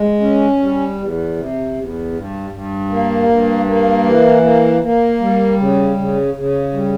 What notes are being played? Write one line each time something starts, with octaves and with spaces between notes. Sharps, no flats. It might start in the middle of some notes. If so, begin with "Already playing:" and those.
Already playing: G#3
C#4
G3
E2
C3
E2
G2
G2
A#3
G2
A#3
E3
A#3
A#3
G3
C#3
C#3
C#3
G3